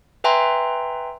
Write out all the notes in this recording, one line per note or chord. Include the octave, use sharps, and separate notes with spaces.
B4 E5 G5 G#5 A#5 C6